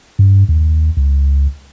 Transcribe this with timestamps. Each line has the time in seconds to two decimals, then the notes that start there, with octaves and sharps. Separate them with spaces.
0.19 G2
0.49 D#2
0.97 C#2